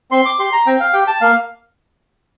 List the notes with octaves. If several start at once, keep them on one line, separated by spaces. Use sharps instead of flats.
C4 C6
D6
G4 C6
A#5
C4 G5
F5
G4 G5
A5
A#3 F5